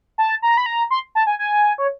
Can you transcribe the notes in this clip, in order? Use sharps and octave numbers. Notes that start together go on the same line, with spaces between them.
A5
A#5
B5
A#5
C6
A5
G#5
G#5
C#5